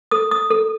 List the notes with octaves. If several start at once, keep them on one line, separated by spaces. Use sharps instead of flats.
A4 D#6
D#6
A4